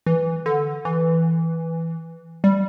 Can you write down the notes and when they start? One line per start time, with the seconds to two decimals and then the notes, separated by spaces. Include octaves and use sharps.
0.06 E3
0.46 D3
0.85 E3
2.44 G3